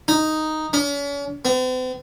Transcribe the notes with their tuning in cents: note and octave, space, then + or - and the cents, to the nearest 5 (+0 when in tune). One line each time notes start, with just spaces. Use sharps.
D#4 +0
C#4 +40
C4 -45